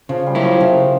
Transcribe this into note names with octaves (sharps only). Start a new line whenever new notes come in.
C#3 F3
G3
F#3 A#3 C#4 E4
F3
C#3